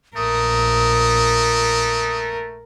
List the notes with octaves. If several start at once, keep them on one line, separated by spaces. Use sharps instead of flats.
A#1 A3 A#4 D#6